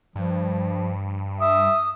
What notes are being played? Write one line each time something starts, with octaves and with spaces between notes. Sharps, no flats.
G2 F3
E5 D#6